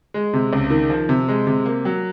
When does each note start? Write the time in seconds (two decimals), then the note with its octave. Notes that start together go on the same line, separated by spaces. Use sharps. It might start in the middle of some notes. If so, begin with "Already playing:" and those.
0.14 G#3
0.34 C3
0.53 C#2
0.70 D#3
0.90 F3
1.09 C3
1.28 G#3
1.47 C3
1.65 A#3
1.85 F#3